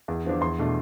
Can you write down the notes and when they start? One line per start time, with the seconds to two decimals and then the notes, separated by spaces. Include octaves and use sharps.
0.08 E2
0.24 D3 F3 B3 D4
0.41 E2 C6
0.59 B2 A3 D4